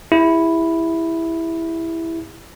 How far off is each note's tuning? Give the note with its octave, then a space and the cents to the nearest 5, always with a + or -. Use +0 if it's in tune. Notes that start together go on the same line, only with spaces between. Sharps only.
E4 +0 G4 +45